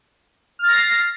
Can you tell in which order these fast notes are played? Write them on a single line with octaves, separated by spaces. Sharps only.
F6 A6 A#6 C7